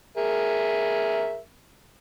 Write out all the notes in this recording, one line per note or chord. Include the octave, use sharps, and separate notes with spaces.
G#4 A#4 E5